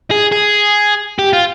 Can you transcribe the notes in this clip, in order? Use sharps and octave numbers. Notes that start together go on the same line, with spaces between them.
G#4
G#4
G4
F4